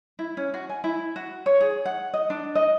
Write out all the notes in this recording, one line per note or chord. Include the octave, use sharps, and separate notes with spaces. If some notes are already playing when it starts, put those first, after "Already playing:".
E4
C#4
F#4
G#5
E4
F#4
C#5
G#4
F#5
D#5
D4
D#5